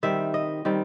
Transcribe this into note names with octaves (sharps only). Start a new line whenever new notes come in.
D#3 G3 C4 E5
D#5
D#3 G3 C4